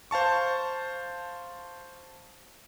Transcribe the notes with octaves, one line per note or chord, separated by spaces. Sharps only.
C5 F5 A5 C#6